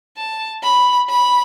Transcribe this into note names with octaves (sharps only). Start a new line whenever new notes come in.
A5
B5
B5